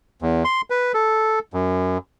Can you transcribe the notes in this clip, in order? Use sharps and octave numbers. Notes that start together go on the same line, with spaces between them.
E2
C6
B4
A4
F#2